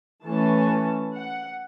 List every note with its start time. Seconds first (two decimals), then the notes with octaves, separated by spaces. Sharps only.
0.24 E3 A3 C#4 A5
1.14 F#5